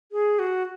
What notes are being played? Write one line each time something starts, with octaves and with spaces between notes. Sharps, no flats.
G#4
F#4